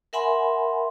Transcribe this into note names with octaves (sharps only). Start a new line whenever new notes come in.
A#4 E5 F#5 G#5 B5 C6